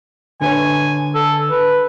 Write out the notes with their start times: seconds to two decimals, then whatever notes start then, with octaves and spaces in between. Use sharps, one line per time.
0.41 D3 B4 C#5 G#5
1.14 A4
1.51 B4